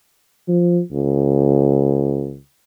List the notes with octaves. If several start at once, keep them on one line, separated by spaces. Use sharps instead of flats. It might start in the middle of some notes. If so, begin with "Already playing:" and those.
F3
C#2